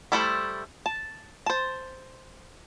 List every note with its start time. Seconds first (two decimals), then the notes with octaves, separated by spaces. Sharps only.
0.12 G3 A3 E4 A4 C5
0.86 A5
1.46 C5 A5